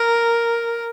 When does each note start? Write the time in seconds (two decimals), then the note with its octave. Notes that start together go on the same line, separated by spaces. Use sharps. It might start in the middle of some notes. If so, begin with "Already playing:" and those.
Already playing: A#4